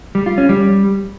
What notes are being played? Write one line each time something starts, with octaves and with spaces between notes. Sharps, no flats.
G3
F4
C#4
G3